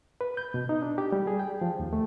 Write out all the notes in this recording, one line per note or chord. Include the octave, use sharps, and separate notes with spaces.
B4
G6
B2
D#4
D4
G4
G3
G#4
G5
F3
D#2
A3